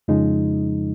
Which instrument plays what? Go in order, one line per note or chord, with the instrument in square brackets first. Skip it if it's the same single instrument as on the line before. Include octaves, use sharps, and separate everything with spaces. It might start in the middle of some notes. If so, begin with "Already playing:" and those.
[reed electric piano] F2 C#3 F3 G#3 D#4